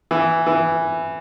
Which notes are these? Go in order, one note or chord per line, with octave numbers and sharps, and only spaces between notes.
E3
E3